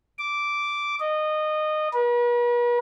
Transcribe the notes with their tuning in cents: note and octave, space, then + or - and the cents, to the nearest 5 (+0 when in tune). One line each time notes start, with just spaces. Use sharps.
D6 -5
D#5 -20
B4 -45